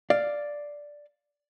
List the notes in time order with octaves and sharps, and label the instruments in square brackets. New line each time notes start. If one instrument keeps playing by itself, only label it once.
[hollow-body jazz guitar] D5 F5